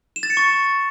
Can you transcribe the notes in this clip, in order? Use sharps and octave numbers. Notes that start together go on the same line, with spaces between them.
E7
A6
C#7
C#6